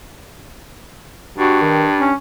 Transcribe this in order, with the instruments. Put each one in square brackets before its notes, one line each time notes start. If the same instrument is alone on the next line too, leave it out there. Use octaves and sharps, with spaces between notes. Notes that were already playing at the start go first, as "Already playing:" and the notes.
[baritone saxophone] G2 [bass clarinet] F#4
[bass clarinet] D#3
C#4